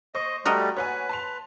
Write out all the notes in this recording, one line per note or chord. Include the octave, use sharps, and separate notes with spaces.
C5 D#5 C#6
G3 A3 F#4 A#4 D#5
B4 C#5 F#5 G#5
A5 C6 F7